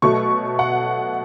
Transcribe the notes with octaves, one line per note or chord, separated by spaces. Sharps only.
B2 F#3 A3 C#6
F#5